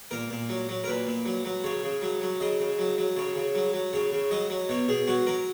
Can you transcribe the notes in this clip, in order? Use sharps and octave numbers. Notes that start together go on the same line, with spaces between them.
A#2 A#4
A#2
F#3
F#3
A#4
A#2 B4
A#2
F#3
F#3
C#3 C#5
C#3
F#3
F#3
C#3 D#5
C#3
F#3
F#3
C#3 C#5
C#3
F#3
F#3
C#3 C#5
C#3
F#3 D#5
F#3
B2 C#5
B2 G#4
F#3 F#4
F#3 A#4